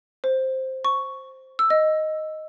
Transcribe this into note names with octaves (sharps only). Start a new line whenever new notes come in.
C5
C#6
E6
D#5